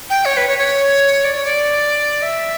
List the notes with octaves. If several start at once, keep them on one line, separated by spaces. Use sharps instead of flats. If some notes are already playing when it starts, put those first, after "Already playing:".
G5
C#5
B4
C#5
C#5
D5
C#5
D5
E5